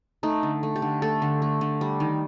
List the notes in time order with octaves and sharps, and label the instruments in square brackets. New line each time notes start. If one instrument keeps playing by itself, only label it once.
[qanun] A3 D#4
D3
A3
G4
D3
A3 A4
D3
A3
D3
G3
D#3